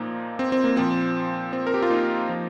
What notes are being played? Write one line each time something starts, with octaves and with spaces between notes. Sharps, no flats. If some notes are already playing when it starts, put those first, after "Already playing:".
Already playing: A#2 F3 A#3 D#4
C4
C4
A#3
A#2 F3 C4
C4
A#4
G4
F4
A#3 D#4
F3